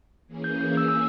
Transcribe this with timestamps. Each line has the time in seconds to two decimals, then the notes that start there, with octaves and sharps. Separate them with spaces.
0.27 E3 A#3 C#4 G#4
0.44 G6
0.61 G6
0.77 E6
0.88 E6